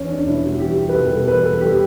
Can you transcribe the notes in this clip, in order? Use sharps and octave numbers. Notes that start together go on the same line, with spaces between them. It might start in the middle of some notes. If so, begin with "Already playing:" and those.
Already playing: E2 C#4
D4
B2 G3 E4
F#4
E2 G4
B4
B2 G3 A4
E2 B4
A4
B2 G3 G4